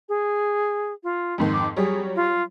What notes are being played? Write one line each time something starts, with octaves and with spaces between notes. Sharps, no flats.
G#4
F4
F2 G#2 D#3
D6
F#3 G3 G#4 C#5
F4